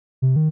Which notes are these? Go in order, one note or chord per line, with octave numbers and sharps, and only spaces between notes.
C3
D#3